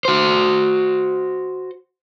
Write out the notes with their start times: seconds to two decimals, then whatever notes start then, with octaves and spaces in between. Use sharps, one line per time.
0.05 F#4 C5